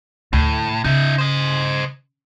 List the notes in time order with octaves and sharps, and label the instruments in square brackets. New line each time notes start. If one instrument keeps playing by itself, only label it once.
[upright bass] D2 [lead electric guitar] A2
[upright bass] C#3 [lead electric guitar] D#4 E5
[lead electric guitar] C5 D#5